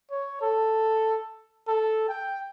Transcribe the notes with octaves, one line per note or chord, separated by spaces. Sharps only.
C#5
A4
A4
G5